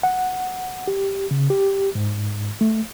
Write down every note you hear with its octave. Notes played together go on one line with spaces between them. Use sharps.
F#5
G4
C#3
G4
G#2
A3